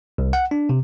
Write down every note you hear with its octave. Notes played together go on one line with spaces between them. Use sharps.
C2
F#5
D4
C3